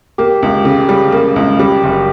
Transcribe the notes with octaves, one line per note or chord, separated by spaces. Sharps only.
A#3 G4
C#2
C#3
G3
A#3
C#2
G3 G4
F#1